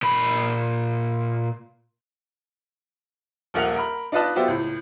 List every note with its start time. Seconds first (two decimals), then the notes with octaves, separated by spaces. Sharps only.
0.02 A#2 B5
3.54 D#1 A#1 A#3 F#5 F7
3.76 A#4 B5
4.12 D4 D#4 F4 B4 D#5 A5
4.35 F#3 B3 F4 G4 C5 E5
4.48 C#2 A2